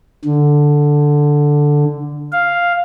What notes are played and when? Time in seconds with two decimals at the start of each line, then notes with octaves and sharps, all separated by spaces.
0.25 D3
2.32 F5